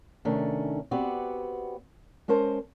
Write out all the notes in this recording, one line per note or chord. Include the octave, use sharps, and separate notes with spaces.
C3 D#3 A3 C#4 D4
B3 C4 F#4 G4 D5
G#3 C#4 A#4 C5 A5